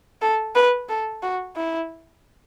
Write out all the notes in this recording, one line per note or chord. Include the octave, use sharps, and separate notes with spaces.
A4
B4
A4
F#4
E4